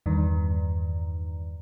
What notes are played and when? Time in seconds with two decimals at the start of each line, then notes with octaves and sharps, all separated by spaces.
0.06 E2 G2 D#3